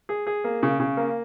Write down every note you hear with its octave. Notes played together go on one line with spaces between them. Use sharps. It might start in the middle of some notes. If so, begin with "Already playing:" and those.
G#4
G#4
A#3
C#3
C#3
A#3